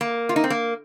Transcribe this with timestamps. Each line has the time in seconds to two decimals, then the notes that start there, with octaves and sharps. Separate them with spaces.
0.01 A#3
0.29 F4
0.36 D#4
0.44 C4
0.50 A#3